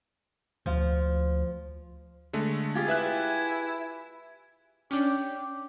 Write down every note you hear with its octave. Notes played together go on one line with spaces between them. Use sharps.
D2 F3
D3 G#3 A3
F4 G4 G#4 G#5
E4 B4 E5 F#6
C#4 D4 G4